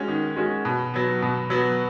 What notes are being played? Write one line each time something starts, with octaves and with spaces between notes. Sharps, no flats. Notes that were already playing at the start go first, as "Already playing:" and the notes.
Already playing: G#3 C#4 F#4
D#3
G#3 C#4 F#4
B2
F#3 B3
B2
F#3 B3